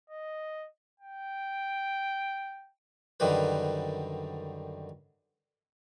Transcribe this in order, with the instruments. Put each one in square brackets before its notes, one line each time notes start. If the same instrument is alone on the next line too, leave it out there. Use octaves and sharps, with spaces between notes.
[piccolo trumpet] D#5
G5
[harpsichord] F#2 D3 D#3 G3 B4